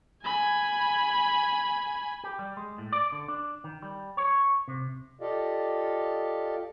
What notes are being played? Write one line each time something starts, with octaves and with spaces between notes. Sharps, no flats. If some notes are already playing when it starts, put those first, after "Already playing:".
G#5 B5
G4
G3
G#3
A2
D5
D3
D4
D#3
G3
C#5
C3
F4 G4 A4 D5 D#5 F5